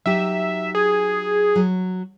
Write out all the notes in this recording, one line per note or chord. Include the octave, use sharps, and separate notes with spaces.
F#3 D#4 G4 E5
G#4
F#3